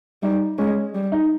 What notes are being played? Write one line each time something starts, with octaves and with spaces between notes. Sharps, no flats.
G3 D#4
G#3 C#4
G3
D#4